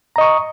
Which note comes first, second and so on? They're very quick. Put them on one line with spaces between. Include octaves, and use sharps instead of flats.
A#5 D#5 C#6 D#6